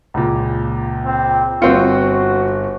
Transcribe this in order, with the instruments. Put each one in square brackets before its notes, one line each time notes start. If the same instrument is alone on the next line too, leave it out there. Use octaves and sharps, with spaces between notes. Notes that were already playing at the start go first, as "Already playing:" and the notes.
[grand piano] C#2 A#2
[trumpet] C4
[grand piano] G1 B4 C#7 [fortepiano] C4 F4 [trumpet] F#4